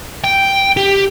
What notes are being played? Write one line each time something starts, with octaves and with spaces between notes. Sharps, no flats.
G5
G4